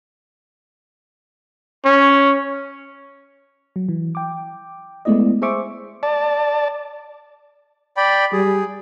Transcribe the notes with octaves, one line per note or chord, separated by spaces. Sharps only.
C#4
F#3
E3
G5 D6
G#3 A3 B3 E4 D5 D#5
G#4 C5 E5 C#6 D6
D5 A5
D5 G5 B5
G3 G#4